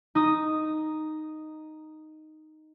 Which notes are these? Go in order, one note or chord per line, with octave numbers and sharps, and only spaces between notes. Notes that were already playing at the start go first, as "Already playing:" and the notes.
D#4 D#6